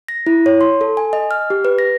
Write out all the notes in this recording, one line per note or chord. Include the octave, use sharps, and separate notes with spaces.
A#6
E4
C#5
C6
A4
G#5
D#5
F6
G4
B4
A#6